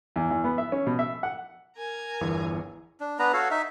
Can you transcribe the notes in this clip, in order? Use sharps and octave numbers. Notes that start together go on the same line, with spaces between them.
E2
E2
B3
E5
C#4
B2
E5
F#5
A#4 G#5 A#5
G1 E2 E3
D4
B3 D4 B4 A#5
F#4 A4 C#5 F5
D#4 E5